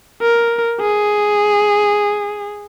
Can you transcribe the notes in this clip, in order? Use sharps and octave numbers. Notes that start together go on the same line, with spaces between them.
A#4
G#4